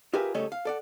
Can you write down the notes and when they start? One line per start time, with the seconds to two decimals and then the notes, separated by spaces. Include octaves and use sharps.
0.13 F4 G4 G#4 A#4 B4 E5
0.34 C#3 G3 A3 A4 C#5 D#5
0.52 F5
0.65 A4 D5 F#5